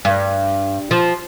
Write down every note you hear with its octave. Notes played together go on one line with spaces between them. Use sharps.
G2
F3